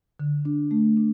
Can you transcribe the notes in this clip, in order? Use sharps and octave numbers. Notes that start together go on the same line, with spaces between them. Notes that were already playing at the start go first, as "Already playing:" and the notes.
D3
D4
A3
D4